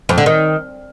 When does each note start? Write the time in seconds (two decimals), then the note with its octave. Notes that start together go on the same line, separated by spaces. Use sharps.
0.09 F2
0.18 D3
0.26 D#3